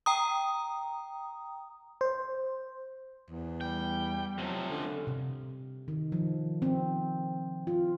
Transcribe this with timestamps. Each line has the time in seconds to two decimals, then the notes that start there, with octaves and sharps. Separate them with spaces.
0.06 G5 A#5 D#6
2.01 C5
3.30 E2
3.61 G3 G5
4.38 C3 F3 F#3
4.70 D3 C#4
5.07 C3
5.88 D#3
6.12 F3
6.62 C4
7.67 F4